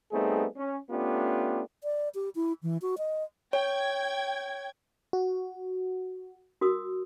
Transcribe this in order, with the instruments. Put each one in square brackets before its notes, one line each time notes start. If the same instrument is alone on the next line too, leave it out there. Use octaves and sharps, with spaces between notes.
[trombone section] G3 A3 B3 C4 D#4 G#4
C#4
A3 B3 C#4 D4 F4 G4
[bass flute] D5
G4
E4
E3
F#4
D#5
[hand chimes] C#5 [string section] G5 G#6
[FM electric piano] F#4
[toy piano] F#4 A#4 D#6